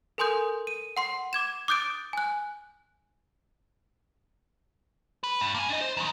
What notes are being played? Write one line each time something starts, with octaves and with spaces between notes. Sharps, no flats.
A4 A#4 G#5 C6 D#6 G6
D#7
F#5 C6 C7
D6 G#6 E7
D6 D#6 F#6 G6 A6 D7
G#5 F#6
B4
G2
A#3 G#5
D4 D#5
C5
F#2 D#3